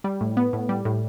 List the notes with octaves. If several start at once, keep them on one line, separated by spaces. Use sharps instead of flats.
G3
A2
B3
A2
G3
A2